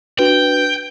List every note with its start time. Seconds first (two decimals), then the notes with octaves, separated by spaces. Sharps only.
0.19 D4 F#4 B4 G5